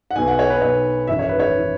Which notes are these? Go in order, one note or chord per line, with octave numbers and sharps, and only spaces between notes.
F#5
B1 B2 B3 G#5
F#5
C#5
B4
B1 B2 B3 C#5
G#1 F#2 E3 E5
C#5
B4
C#5
E3